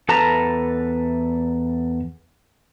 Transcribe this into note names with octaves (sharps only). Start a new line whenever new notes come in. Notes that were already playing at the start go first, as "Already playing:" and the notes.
E2 A4 B4 A5 A#5